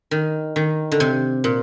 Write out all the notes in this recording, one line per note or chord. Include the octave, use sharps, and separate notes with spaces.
D#3
D#3
D3
C3
A#2